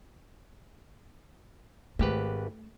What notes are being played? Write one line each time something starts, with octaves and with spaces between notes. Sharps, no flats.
G#1 A3 G4 B4